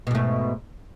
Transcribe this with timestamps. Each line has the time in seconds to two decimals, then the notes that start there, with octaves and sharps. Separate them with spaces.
0.07 B2
0.11 G#2
0.15 A3